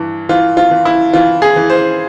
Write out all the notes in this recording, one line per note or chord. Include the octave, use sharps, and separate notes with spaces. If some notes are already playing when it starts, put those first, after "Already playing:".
Already playing: G2 E3
E3 F4
F4
E3
E4
E3 F4
G#4
E3
C5